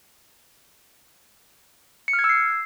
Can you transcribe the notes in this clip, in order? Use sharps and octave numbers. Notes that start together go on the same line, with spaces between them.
C#7
F6
G#6
E6
C7